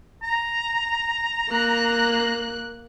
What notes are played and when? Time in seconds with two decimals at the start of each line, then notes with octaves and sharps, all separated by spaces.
0.23 A#5
1.49 A#3 F#6